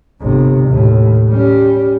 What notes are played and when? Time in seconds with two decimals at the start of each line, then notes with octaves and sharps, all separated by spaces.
0.21 G1 C3
0.68 D#2 A2
1.29 G3 C#4